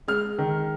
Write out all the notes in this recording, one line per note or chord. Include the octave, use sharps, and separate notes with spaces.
G#3 F6
D#3